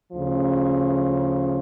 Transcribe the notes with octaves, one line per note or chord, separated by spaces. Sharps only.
D2 C#3 F3